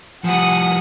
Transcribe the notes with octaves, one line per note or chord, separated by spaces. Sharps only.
F3 G3 F#5 G#5 D#6